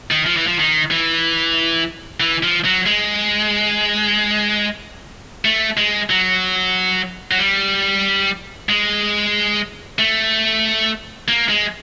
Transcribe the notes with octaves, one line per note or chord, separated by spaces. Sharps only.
D#3
F3
E3
F3
D#3
E3
E3
F3
F#3
G#3
A3
G#3
F#3
F#3
G3
G#3
A3
A#3
G#3